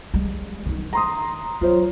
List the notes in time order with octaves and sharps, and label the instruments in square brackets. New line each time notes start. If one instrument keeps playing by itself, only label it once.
[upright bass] G3 G#3
D#3 D#4
[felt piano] A#5 C6 D#6
[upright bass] F#3 [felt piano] F4 C5 C#5